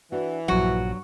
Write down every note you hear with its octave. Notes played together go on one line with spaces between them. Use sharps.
E3 D4 F#4
A#1 G2 F3 F#3 F#4